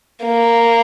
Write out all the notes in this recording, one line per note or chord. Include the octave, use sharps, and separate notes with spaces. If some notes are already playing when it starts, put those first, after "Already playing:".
A#3